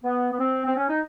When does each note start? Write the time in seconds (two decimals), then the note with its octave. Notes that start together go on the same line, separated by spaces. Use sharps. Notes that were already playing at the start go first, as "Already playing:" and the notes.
0.04 B3
0.32 B3
0.39 C4
0.66 C4
0.76 C#4
0.89 D#4